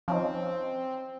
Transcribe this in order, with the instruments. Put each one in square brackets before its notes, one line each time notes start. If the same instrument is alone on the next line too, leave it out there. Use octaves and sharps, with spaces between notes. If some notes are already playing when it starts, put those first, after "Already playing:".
[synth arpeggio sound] F3 C#4 D#4 [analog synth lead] C4